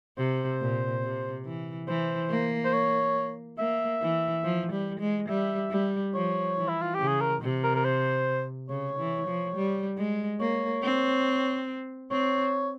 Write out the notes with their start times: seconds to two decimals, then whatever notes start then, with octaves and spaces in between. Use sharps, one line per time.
0.17 C3 C5
0.61 A#2
1.03 C3
1.46 E3
1.88 E3 C5
2.30 A#3
2.65 C5
2.73 C#5
3.58 A#3 E5
4.02 E3
4.44 F3
4.72 G3
5.00 G#3
5.28 G3 E5
5.71 G3
6.14 F3 C#5
6.57 E3
6.69 E4
6.82 F4
6.94 G4
7.00 C#3
7.08 G#4
7.21 A#4
7.41 C3
7.64 A#4
7.76 A#4
7.85 C5
8.69 C#3 C#5
8.99 E3
9.27 F3
9.56 G3
9.97 G#3
10.40 A#3 C#5
10.82 C4
12.11 C4 C#5